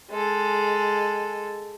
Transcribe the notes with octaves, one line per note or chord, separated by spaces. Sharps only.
G#3 A4